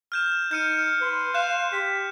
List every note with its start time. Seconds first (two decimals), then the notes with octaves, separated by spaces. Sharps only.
0.12 F6 G6 E7
0.51 D#4 F6 G6 C#7 D#7
1.01 B4 C6
1.34 F5 F#6 G6 E7
1.72 G4 B6